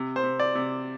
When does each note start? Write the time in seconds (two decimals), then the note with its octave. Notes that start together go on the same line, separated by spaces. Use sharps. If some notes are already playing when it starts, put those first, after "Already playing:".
Already playing: C3
0.16 C5
0.24 C3
0.40 D5
0.55 C3